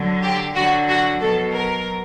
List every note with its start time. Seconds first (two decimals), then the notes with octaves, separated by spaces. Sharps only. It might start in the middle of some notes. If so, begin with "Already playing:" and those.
Already playing: D3 F#3
0.23 G4
0.55 D3 F#3 F#4
0.88 F#4
1.21 B2 F#3 A4
1.53 A#4